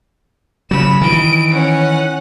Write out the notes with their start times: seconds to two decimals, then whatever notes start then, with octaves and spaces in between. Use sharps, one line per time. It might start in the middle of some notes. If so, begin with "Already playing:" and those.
0.71 C#3 F#3 B5 E7
1.01 D#3 E3 D7
1.51 C#4 F#5